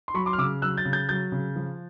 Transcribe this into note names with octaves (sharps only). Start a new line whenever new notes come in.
C6
F#3 B5 C#6
C6 D6
F6
C#3 D6 E6
F#3 E6 F#6
G6 A6
C#3
G6 A6
F#3 G6 A6
C#3
F3